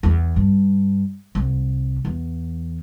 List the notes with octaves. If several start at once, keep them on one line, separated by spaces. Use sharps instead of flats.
E2
G2
C2
E2